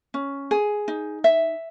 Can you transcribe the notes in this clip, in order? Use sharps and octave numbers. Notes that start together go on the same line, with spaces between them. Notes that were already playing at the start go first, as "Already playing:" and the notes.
C#4
G#4
D#4
E5